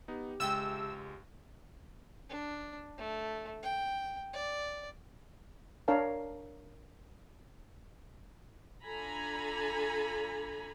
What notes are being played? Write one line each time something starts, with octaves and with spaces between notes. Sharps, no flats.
B3 D#4 G4
C#2 G#3 E5 G5 A5 E6
D4
A3
G5
D5
D4 A#4 C#5 F5 A5
D4 F4 A4 G#5 A#5 B5